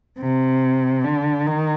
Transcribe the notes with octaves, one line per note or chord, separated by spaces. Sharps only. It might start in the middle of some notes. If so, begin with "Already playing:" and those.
C3
D3
D#3